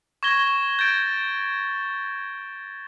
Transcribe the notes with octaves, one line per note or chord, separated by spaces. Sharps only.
C#6 G#6 A#6 G7
G6 A6 D7